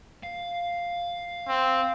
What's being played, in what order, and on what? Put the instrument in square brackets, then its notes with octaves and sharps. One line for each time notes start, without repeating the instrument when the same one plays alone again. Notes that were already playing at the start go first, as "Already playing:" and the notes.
[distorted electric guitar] F5
[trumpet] C4